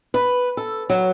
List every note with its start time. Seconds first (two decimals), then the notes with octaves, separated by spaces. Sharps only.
0.14 B4
0.57 A4
0.90 F#3